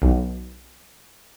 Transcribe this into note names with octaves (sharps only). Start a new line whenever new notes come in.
B1